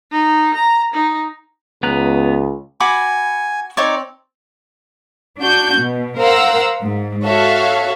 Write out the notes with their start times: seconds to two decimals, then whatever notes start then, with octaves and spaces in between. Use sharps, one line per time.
0.11 D#4
0.54 A#5
0.94 D#4
1.83 C#2 B3 A#5 F#6
2.80 F#4 G#5 B5 D6
3.77 C4 D#4 C#5 D5
5.38 D4 F#4 G6
5.77 B2
6.19 A#4 C5 F5 F#5 A#5 E6
6.81 G#2
7.23 F#4 A4 C#5 E5 F5